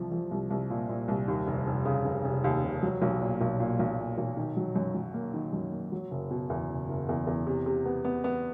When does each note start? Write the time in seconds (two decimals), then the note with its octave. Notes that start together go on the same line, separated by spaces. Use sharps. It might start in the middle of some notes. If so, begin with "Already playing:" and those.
Already playing: C2 F3
0.11 F3
0.31 C2
0.50 C2
0.70 A#2
0.89 A#2
1.08 C2
1.28 D#2
1.47 F1
1.66 F1
1.85 C#3
2.05 F1
2.24 F1
2.44 D#2
2.63 F1
2.83 F#3
3.02 B1
3.21 A#2
3.41 B1
3.60 A#2
3.79 B1
3.99 A#2
4.18 B1
4.37 D#3
4.57 F#3
4.76 F#2
4.95 F#3
5.14 A#3
5.34 D#3
5.53 F#2
5.72 A#3
5.92 F#3
6.11 F#1
6.31 B2
6.50 E2
6.69 F#1
6.89 F#1
7.09 E2
7.27 E2
7.47 C3
7.66 C3
7.85 B3
8.04 B3
8.24 B3